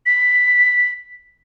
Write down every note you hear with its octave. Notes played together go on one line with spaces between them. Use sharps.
B6